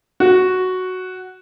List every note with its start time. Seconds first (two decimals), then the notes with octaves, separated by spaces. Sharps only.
0.20 F#4